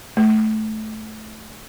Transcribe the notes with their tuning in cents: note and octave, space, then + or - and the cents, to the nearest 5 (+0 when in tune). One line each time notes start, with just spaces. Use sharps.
A3 -15